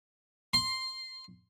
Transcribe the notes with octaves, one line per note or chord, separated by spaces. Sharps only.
C6